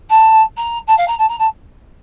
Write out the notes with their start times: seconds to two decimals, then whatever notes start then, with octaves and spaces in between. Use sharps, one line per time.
0.09 A5
0.57 A#5
0.87 A5
0.97 F5
1.08 A#5
1.18 A5
1.28 A#5
1.39 A5